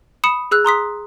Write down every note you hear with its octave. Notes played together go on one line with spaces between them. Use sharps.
B5 D#6 C#7 E7
G#4 E6 F#6
A#5 C6 D#6 B6